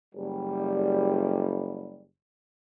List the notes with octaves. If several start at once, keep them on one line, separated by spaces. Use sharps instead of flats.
F#1 G3